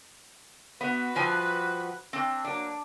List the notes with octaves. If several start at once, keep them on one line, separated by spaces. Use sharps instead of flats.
B3 F#4 B4
G2 F3 G#5
C4 D4
F#3 A#3 D4